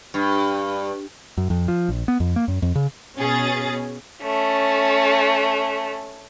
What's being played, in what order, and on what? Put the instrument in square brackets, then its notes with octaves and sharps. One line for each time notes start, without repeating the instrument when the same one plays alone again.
[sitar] G2
[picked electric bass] F#2
F2
F3
A#1
B3
F2
A#3
F#2
F2
C#3
[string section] B2 C#4 G#4 A6
[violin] A3 C#4